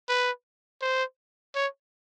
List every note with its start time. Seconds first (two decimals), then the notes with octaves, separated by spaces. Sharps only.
0.09 B4
0.82 C5
1.55 C#5